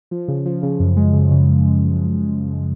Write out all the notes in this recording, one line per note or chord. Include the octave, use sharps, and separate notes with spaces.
F3
C#3
F3
C#3
F#2
G#3
C#3
C#3